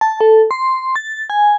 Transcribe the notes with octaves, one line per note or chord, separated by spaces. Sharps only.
A5
A4
C6
A6
G#5